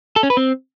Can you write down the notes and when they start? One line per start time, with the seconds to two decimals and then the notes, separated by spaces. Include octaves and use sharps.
0.16 A4
0.23 C#4
0.30 B4
0.37 C4